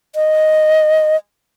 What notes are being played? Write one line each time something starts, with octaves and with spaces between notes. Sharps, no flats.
D#5